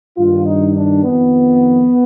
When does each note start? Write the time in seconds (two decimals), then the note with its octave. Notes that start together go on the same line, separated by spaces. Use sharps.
0.17 G2 D#3 F4
0.46 D#4
0.75 D4
1.04 F2 D#3 B3